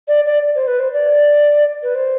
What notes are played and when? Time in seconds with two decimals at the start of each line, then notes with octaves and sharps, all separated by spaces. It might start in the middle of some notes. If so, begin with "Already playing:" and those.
0.08 D5
0.26 D5
0.56 C5
0.68 B4
0.80 C5
0.93 D5
1.83 B4
1.95 C5